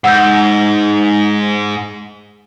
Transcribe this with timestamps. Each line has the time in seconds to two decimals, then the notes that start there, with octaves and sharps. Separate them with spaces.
0.04 G#2 F#5 E6 G6